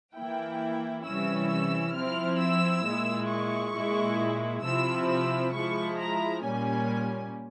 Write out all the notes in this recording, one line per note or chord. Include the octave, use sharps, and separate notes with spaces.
E3 A#3 E4 G5
C3 E3 G3 C#4 E4 E6
E6
F3 C4 E4 F6
E6
A#2 G#3 E4
C#6
A#2 G#3 E4
C3 F3 C4 E4 E6
E6
F3 G#3 E4 C#6
A#5
A#2 G3 A#3 C#4 G#5